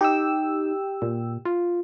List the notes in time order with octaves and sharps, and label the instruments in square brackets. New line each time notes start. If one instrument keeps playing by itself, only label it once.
[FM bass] D#4 [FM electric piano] G4 G5 E6
[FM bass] A#2
F4